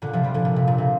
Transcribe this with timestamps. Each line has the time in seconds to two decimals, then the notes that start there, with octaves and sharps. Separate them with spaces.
0.02 A#2 D3
0.13 C3 F3
0.23 D3 G3
0.34 A#2 D3
0.45 A#2
0.56 C3
0.67 A#2
0.78 C3